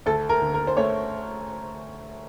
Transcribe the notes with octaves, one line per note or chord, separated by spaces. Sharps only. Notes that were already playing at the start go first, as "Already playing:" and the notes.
D2 A4
A#4
D3
A#4
C5
A3 C#5